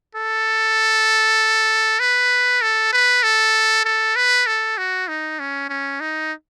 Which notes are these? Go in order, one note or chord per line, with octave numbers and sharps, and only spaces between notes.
A4
B4
A4
B4
A4
A4
B4
A4
F#4
D#4
C#4
C#4
D#4